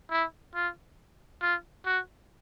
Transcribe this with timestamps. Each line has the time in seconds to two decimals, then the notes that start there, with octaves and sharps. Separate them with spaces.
0.11 E4
0.55 F4
1.42 F4
1.86 F#4